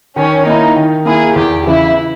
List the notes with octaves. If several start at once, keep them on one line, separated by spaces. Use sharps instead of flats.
D#3 C#4
A#3 D#4 E4
D#3
A#3 E4 G#4
E2 G4
C#3 E3 E4